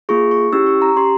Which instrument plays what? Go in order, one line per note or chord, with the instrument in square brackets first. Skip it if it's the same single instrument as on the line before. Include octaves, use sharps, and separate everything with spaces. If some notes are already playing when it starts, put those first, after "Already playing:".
[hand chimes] A#3 F4 G#4 C#6
C#6
C#4 E4 G4 E6
C#6
A#5
C#4 G4 C6